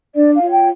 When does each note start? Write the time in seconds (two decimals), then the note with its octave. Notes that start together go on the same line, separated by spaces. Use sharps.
0.14 D4 D5
0.33 F5
0.42 F4 C#5
0.51 G5